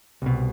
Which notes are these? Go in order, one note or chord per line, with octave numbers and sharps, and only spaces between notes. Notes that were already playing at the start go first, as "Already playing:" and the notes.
C2 B2